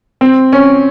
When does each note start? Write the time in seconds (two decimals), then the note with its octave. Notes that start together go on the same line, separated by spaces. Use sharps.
0.21 C4
0.52 C#4